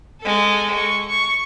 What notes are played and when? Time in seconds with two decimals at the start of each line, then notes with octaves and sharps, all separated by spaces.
0.21 G#3 A4
0.74 C#6
1.09 C#6